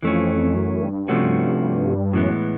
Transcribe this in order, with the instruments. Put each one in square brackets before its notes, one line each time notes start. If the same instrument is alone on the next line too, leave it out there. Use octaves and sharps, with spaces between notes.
[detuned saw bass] F2 [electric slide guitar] E3 A3 C#4
[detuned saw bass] F#2
G2
[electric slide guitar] C3 F3 A3 C#4 F#4
[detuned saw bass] F#2 [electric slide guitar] A2 E3 G#3 B3